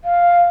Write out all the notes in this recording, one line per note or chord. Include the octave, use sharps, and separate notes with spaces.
F5